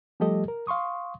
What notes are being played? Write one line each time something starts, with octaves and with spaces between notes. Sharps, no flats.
F3 G3 A3 G4 A4 D#5
A#4
F5 C6 C#6 D#6